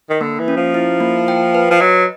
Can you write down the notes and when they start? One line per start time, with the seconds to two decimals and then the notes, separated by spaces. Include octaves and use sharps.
0.10 D#3
0.21 D3 A#3
0.39 E3
0.48 C#4
0.57 F3
0.74 E4
1.00 A#3
1.28 G5
1.55 B4
1.71 F3
1.80 F#3 D#5